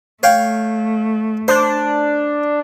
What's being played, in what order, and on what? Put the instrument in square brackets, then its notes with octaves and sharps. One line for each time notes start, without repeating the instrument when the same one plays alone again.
[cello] A3 [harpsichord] C#5 F5 G5
[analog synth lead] D4 [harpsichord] C5